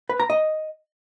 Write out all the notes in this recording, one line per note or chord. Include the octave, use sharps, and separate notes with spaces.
B4
A#5
D#5